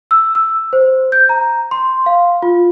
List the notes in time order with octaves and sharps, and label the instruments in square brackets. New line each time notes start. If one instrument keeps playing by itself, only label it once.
[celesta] E6
E6
C5
G6
A#5
C6
F5
F4